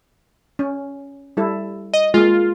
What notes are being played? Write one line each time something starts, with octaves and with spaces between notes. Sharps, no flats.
C#4
G3 E4 A4
D#5
G#3 A#3 F4